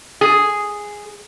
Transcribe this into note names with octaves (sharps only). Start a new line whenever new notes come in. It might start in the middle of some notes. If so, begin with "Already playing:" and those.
G#4